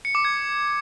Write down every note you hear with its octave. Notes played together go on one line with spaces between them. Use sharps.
C#7
D6
G#6